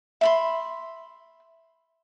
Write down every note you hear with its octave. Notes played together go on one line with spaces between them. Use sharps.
E5 B5 C6